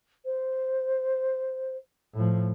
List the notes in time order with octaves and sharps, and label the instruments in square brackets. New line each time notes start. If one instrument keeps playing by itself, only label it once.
[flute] C5
[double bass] A2 F3